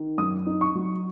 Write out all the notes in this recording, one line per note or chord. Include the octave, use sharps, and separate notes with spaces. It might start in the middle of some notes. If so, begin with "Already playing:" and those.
Already playing: D#3
F#2 D#6
D#4
C#6
F#3